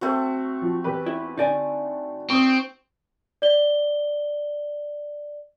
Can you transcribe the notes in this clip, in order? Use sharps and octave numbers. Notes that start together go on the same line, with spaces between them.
A3 C4 F#4
F3
E2 G4 B4
E4
D3 D#4 D5 G#5
C4 C#6 D#6
D5 G7